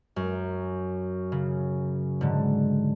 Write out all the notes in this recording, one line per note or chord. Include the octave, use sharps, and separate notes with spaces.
F#2
C#3
G#2 D3